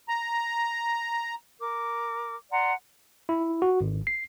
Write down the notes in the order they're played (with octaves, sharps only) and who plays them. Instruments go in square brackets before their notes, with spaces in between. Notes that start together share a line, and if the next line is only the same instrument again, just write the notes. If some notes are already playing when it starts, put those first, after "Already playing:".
[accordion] A#5
[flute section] A#4 D6
D5 F#5 A#5 C6
[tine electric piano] E4
F#4
G#1
C7